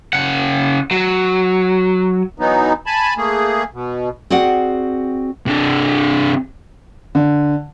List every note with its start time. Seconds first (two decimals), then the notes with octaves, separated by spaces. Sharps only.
0.13 C#3 F#5
0.91 F#3
2.38 E3 F#3 B3 D#4
2.86 G#5 A5 B5
3.17 A3 A#3 G#4
3.74 B2
4.30 C4 F#4 G#4 D5 F#5
5.46 C3 D4
7.15 D3